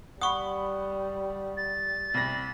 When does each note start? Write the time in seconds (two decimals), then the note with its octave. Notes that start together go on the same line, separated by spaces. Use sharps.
0.21 G3 F#5 B5 C#6 D#6
1.57 A6
2.14 C2 B5 A#6